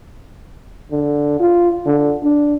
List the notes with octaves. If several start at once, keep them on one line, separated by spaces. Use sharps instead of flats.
D3
F4
D3
D4